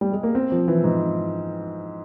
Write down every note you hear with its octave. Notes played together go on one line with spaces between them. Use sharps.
G3
G#3
A#3
C4
F3
E3
G#2